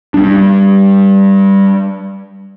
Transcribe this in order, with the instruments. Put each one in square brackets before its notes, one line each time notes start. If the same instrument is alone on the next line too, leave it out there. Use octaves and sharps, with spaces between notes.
[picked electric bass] G3 G#3 D4